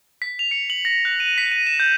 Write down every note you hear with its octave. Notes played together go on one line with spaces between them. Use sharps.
B6
F7
C#7
F#7
A#6
F#6
D#7
B6
D#7
E7
G6